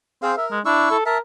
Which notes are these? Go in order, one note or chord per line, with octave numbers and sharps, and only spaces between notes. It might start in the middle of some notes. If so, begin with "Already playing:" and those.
C4 G#4 C5 F5
A#4 E5
G#3
D4 E4 C#6 E6
A4
A#4 E5 A5